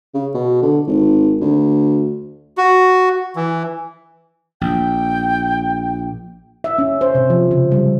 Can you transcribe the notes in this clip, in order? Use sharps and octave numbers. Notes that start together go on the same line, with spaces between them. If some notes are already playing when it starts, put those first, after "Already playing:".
C#3
B2
D3
G#1
D2
F#4
E3
A#1 G5
E5
C#4
C5
C3
F3
C#3
G3